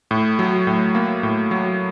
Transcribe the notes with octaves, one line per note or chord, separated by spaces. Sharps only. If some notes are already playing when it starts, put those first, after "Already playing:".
A2
F#3
A2
A#3
A2
F#3